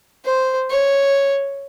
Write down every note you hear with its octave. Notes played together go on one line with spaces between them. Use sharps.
C5
C#5